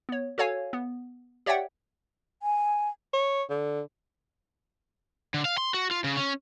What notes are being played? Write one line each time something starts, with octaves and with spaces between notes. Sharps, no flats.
B3 C#5
F#4 A4 C#5 F5 G#5
B3
G4 C#5 D5 E5 F#5 G5
G#5
C#5
D3
D3
F5
C6
F#4
F4
C#3
C#4